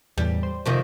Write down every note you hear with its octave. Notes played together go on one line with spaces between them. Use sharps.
E2 A2 G3
C5
F2 C3 D#3